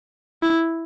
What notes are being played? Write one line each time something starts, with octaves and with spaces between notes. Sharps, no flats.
E4